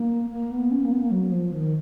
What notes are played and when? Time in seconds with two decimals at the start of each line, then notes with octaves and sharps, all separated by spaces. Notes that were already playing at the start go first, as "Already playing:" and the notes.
Already playing: A#3
0.31 A#3
0.51 B3
0.71 C#4
0.85 A#3
0.92 B3
1.02 A#3
1.11 F#3
1.32 F3
1.52 D#3